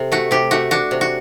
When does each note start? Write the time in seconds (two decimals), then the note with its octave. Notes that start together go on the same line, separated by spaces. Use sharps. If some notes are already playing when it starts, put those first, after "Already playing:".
Already playing: C3 A4
0.12 A3 F#4
0.31 C3 G4
0.51 A3 F#4
0.71 D4 F#4
0.91 C3
1.01 F#4